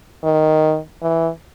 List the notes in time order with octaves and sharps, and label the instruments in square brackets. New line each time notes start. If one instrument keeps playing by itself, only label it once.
[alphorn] D#3
E3